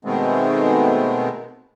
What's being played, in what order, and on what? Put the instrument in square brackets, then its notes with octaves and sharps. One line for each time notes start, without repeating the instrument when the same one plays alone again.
[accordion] B2 D#3 G#3 A3 B3 C4